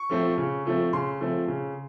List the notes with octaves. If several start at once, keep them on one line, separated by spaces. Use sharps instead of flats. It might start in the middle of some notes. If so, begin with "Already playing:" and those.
Already playing: C#6
F3 A3 C4
C#3
F3 A3 C4
C#3 C6
F3 A3 C4
C#3